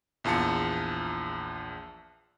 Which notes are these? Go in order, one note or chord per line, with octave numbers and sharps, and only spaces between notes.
A#1 E2 F4 A5 C#7